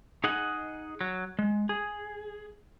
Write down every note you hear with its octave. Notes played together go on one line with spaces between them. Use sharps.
D#4 G#4 D#5 F#5
F#3
G#3
G#4